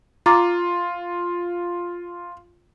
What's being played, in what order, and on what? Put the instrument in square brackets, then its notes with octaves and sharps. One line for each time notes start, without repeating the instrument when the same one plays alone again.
[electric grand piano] F4 [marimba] A#5 D6 A6